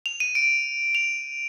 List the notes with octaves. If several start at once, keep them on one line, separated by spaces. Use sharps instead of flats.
F7
D#7
D7
F7